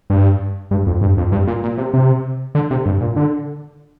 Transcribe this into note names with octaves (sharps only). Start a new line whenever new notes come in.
G2
G2
F2
G2
F2
G2
A#2
A#2
C3
C3
D3
C3
G2
A#2
D3